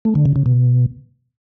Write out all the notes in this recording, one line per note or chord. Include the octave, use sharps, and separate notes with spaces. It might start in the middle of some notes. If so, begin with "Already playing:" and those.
A3
D3
C#3
C#3
B2